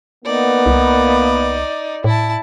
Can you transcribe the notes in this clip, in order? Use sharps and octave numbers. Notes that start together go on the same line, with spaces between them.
A#3 B3 D#4 D5
C2
A2 E4 A5